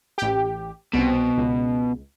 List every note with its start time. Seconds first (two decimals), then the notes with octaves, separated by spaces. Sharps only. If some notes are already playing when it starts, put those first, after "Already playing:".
0.18 A1 G4
0.94 C2 B2 C4
1.37 C#2